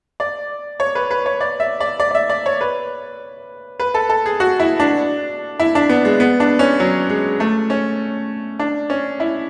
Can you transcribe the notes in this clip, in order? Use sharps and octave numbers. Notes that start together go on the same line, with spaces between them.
D5
C#5
B4
B4
C#5
D5
E5
D5
D5
D5
E5
D5
C#5
B4
B4
A4
A4
G#4
F#4
E4
D4
E4
D4
B3
G#3
B3
D4
C#4
F#3
G#3
A3
C#4
D4
C#4
E4